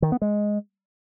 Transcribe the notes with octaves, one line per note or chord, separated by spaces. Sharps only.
D#3
B3
G#3